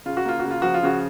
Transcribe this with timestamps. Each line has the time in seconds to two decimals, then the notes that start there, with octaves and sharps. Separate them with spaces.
0.06 C#3 F4
0.17 F#4
0.25 A#3 F4
0.40 C#3 F#4
0.51 F4
0.62 F3 F#4
0.74 F4
0.83 C#3 F#4